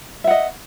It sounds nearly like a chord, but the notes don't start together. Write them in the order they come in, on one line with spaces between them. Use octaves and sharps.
E5 F#5 D#5